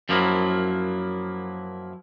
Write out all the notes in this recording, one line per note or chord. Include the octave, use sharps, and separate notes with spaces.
F#2 F3 F#3 A#3 E4